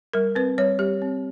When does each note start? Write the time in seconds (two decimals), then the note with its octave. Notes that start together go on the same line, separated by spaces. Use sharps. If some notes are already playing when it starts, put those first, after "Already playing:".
0.13 G3 A#4
0.35 C4 B4
0.58 G3 C#5
0.79 G3 G4
1.02 C4